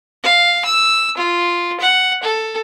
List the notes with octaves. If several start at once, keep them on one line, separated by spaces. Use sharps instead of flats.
F5
E6
F4
F#5
A4